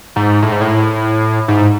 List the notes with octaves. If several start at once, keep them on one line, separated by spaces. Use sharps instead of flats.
G#2
A2
G#2
A2
G#2